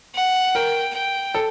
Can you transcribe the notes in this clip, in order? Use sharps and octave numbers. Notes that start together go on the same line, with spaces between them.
F#5
A#4 G5
G5
A4